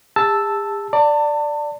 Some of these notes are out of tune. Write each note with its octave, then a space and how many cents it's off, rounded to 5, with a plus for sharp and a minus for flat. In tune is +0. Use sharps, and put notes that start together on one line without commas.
G#4 -45 A5 +0 E6 +0
D5 +0 A5 +30